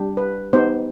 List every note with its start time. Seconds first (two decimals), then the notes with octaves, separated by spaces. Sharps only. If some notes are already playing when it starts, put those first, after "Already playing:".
Already playing: G3 D4 G4
0.17 B4
0.53 B3 D#4 G4 C5